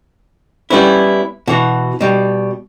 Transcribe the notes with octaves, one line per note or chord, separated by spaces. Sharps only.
G3 B3 C#4 E4
B2 E3 F#4
B2 G3